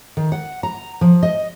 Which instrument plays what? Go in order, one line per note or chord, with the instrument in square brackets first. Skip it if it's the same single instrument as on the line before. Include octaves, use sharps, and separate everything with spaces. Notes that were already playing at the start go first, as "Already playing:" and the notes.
[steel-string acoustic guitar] D#3
F#5
A#5
F3
D#5